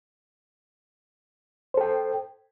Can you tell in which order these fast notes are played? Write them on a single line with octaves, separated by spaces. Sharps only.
C5 A4 G5